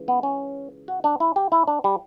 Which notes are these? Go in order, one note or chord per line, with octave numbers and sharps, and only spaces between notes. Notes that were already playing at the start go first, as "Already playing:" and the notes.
Already playing: C#2 C#3 E3
B3
C#4
F#4
D4
E4
G4
E4
D4
G3